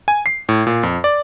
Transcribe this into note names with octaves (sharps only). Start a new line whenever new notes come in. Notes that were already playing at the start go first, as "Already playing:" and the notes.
G#5
C7
A2
A#2
F2
D5